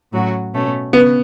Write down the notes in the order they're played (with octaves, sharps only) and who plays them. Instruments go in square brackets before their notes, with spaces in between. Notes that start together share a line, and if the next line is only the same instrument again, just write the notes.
[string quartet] A2 F#3 C#4 F#4
B2 A3 C#4
[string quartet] C#3 [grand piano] B3